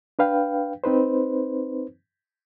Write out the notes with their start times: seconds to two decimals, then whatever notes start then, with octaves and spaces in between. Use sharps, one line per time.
0.19 D4 B4 F5 G5
0.84 C4 D#4 B4 C5